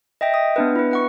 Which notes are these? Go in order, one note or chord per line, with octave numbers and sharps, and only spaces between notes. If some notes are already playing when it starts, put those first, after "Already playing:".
D#5 E5 G5 A#6
D#6
B3 D4 B4
E4 B4
B4 F#5 C#6